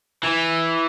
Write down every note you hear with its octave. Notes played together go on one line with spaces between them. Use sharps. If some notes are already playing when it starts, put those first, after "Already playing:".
E3